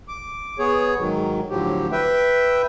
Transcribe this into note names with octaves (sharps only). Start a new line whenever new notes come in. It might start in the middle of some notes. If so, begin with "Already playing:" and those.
D6
B3 G#4 C#5
G#2 D#3 F#3
A2 D3 F3 F#3 G4
B4 E5 G5